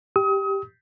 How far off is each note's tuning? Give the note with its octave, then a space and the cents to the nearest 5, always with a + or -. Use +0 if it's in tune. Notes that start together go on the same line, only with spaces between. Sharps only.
G4 +0 D#6 +35